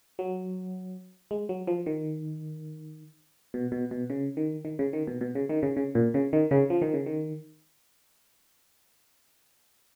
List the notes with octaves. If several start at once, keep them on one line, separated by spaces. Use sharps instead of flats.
F#3
G#3
F#3
F3
D#3
B2
B2
B2
C#3
D#3
D#3
C#3
D#3
B2
B2
C#3
D#3
C#3
C#3
A#2
C#3
D#3
C#3
F3
D#3
C#3
D#3